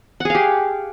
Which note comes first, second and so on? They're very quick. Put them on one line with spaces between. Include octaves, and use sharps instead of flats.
F#5 G#4 F5 G4